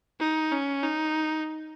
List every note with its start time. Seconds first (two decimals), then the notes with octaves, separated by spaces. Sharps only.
0.20 D#4
0.52 C#4
0.84 D#4